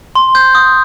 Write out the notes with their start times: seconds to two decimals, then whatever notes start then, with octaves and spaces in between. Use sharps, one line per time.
0.15 C6
0.35 G6
0.55 D#6